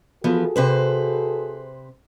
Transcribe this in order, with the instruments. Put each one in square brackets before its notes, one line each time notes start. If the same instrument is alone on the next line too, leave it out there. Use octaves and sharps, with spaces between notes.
[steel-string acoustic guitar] E3 F3 B3 [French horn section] F#4 G#4 A4
[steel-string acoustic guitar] C3 B4 C5